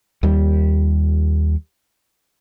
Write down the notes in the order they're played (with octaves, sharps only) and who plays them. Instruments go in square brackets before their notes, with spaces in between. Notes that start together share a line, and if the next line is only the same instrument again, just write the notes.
[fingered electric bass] D#2 G3